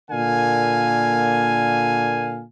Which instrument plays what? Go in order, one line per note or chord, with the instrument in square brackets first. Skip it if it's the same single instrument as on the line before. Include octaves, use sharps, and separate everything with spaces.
[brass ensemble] A#2 D3 A#3 F5 G#5